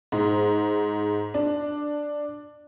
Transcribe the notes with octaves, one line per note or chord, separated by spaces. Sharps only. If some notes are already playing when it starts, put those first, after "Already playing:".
G#2
D4